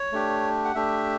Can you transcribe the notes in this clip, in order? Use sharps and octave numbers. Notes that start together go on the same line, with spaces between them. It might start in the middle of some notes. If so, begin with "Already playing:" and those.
Already playing: C#5
A3 D4 G4
F#5
A3 D4 G4 E5